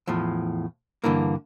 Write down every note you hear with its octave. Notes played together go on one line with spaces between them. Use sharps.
E2 A2 F3
G2 D3 E3 A#3